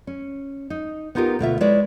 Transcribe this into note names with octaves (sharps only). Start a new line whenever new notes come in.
C#4
D#4
B3 D#4 F4 G4 A#4
D2 B2 F4 E5
G#3 E4 B4 C#5 D5